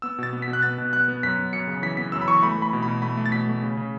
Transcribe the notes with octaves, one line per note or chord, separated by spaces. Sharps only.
B3 E6
B2 A6
B3
B6
B2
F#6
B3 A6
B2
B3 F#6
B3
F#2 B6
F#2
F#2 C#7
C#3
E3 B6
B3 B6
F#2 E6
B5
E3 C#6
A3 B5
A3 B5
B2
B5
B2
A3 B5
A3
A6
B2 B6
A3
C#3
C#3